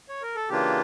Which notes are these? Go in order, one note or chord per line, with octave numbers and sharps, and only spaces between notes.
C#5
A#4
A4
C#3 E3 A#3 D4 F4 G4